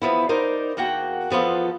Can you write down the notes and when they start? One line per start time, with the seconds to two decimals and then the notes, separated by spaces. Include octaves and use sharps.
0.02 E2 F3 B3 E4
0.29 D#4 A#4 C5 D5
0.77 E2 A#3 F#4 F#5 G5
1.30 E2 F3 B3 F4 A4